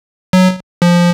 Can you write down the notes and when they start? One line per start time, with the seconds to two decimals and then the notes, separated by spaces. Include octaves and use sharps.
0.33 F#3
0.82 F3